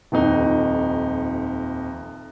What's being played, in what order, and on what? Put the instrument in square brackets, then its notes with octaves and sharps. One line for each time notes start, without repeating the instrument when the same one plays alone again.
[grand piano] D#1 F2 D#4